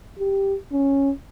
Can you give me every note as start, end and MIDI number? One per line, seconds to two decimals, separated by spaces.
0.19 0.56 67
0.72 1.11 61